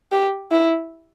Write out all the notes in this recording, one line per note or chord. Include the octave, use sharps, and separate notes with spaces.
G4
E4